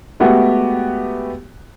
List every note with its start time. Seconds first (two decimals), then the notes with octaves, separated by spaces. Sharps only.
0.20 G#3 A3 B3 F#4 G4